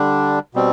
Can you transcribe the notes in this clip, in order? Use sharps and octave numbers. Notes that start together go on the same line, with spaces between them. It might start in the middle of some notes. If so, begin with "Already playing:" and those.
Already playing: D3 G3 D4
B2 G3 C4